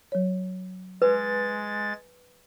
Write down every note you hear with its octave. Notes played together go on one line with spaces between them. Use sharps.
F#3 C#5
G#3 B4 A6